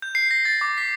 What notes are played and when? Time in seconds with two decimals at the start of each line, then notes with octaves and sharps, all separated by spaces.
0.02 G6
0.15 C7
0.31 A#6
0.45 A6
0.61 D6
0.78 B6